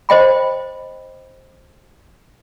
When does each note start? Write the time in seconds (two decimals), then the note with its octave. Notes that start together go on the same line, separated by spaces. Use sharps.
0.09 C5 D#5 G5 B5